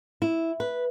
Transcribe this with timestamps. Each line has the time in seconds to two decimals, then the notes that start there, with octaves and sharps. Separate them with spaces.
0.22 E4
0.60 B4